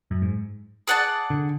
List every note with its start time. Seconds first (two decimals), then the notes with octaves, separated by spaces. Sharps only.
0.11 F#2
0.22 G#2
0.88 G#4 D5 F#5 A5
1.30 D3